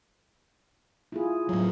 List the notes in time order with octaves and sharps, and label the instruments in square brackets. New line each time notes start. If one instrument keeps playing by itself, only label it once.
[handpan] E4 F4 G#4
[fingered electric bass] A2 F#3